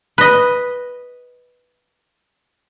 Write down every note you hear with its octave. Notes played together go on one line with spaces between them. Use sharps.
B4 D#5